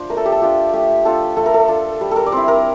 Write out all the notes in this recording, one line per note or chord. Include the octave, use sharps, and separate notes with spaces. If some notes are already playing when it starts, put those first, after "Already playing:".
Already playing: D4 F4 C5
A3 A#4
A4
G4
A4
D4 F4 G4
A3 G4
D4 F4 A4
A3 A4
A#4
A4
D4 F4
G3
A4 A#4
D5
C4 E4 C5
A#4